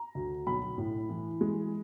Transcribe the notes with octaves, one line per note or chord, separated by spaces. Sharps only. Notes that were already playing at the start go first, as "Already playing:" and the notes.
Already playing: A#5
D2
B1 B5
A2
E3
G#3